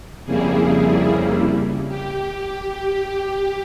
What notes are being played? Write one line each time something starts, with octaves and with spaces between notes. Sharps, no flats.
F2 C#3 G3 A#3 E4 G#4
G4
G4